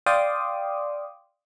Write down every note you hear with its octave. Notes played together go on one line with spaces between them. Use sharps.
D5 F5 G5 C6 D6 D#6